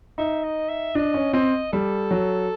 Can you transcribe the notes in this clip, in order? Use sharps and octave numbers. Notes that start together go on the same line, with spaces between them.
D#4 E5
D#5
E5
D4 D#5
C#4
C4 D#5
G3 A4
F#3